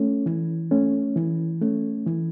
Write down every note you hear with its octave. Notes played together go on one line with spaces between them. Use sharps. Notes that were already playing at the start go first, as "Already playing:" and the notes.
Already playing: A3 C#4
E3
A3 C#4
E3
A3 C#4
E3